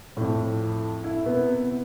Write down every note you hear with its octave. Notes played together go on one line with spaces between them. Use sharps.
F2 A2
E4
C3 B3